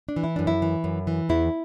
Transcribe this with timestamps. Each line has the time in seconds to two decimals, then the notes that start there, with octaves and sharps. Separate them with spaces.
0.09 D4
0.16 E3
0.24 E4
0.36 F#2 D4
0.47 E4
0.62 E3
0.84 F#2
1.07 E3
1.29 E2 E4